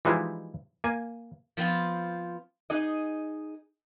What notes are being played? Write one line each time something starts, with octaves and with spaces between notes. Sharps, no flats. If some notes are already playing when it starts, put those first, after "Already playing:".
E3 F3 G3 G#3 D#4 E4
A#3 G#5
F3 B3 C4 F4
D#4 G#4 D#5